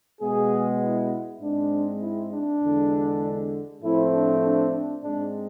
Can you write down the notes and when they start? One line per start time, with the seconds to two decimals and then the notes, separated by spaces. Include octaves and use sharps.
0.21 B2 G#3 B3 G#4
0.82 E4
1.42 G#2 G#3 C4 D4
2.02 E4
2.32 D4
2.62 E2 D3 G#3
3.82 A2 F3 A3 C4 E4
4.13 D4
4.43 D4
4.73 D4
5.03 G#2 G#3 C4 D4